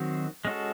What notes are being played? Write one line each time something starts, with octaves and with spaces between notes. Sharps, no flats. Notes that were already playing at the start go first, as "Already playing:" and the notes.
Already playing: D#3 F#3 C4 F#4 C5
G#3 C#4 F#4 A4